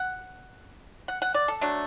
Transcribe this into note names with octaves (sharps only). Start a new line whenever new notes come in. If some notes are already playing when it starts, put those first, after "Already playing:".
Already playing: F#5
F#5
F#5
D5
A4
F#3 A3 D4